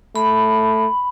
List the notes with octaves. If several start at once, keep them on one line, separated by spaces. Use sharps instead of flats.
A3 B5